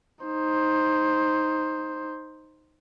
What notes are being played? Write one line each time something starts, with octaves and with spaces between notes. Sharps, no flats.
D#4 C5